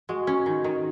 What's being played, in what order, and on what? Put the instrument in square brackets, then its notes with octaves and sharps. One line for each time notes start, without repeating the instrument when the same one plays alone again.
[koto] G#3 [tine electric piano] F#4
[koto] C#4
D#3
D#3